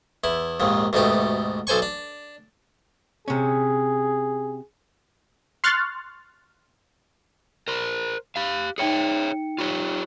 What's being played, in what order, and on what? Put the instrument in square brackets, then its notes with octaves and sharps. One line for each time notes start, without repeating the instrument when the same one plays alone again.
[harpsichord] E2 E4
A#1 D#2 G#2
D2 G#2 B2 A3 G4
B1 A4 C5 G#5 C#6
D4
[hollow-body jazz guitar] C3 C#4 [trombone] G#4
[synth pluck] C6 C#6 F6 F#6 A6
[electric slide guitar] A#4 C5
G4 F5
[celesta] D#4 G5 C#7 [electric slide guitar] G#4 C#5 E5
[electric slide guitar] F4 G4 C#5